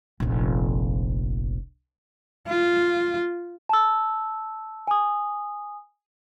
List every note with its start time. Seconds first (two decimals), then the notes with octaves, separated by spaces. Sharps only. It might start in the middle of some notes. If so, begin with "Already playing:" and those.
0.20 F1 A#1
2.48 F4
3.69 A5 E6
4.87 G#5 D#6